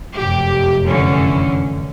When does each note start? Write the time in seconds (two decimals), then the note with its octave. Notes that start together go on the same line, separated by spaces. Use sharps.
0.17 F1 F#2 G4
0.87 D3 E3 C#4